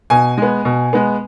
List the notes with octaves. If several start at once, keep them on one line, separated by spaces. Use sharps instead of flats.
B2 G#5
G#3 B3
B2
G#3 B3